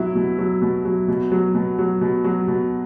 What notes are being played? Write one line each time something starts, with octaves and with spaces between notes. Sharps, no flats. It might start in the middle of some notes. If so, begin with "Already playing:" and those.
Already playing: B2 F#3 E4
B2
F#3
B2
F#3
B2
F#3
B2
F#3
B2
F#3
B2